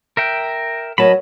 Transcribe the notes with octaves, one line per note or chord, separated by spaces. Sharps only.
A#4 E5 G5
F#3 A#4 C#5 D#5 A5 B5